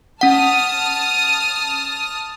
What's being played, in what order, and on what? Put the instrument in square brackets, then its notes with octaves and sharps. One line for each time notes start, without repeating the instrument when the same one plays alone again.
[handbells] C#4 F#5 [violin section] A5 D#6 F6